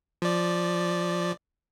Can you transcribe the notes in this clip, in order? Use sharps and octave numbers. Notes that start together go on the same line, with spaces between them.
F3 D5